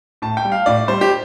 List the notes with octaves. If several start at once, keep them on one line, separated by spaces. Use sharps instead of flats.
A2 A5
G5
G3
F5
A2 D5
G3 C5
G4